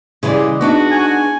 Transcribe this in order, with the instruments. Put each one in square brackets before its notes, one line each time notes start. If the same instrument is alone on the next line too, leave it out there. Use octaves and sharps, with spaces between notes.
[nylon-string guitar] C#3 E3 G3 [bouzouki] G#3 D5
[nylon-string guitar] B3 D4 D#4 [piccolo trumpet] F#4
[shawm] G#5